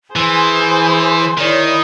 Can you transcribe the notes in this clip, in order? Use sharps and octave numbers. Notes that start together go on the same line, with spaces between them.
E3 G#4 C5 G#5 C6
D#3 E4 C#5 D5